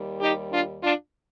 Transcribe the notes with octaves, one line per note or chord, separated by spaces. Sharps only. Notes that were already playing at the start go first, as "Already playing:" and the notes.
Already playing: D#2 D#3 G3
D#4 G4
D4 F4
D4 F4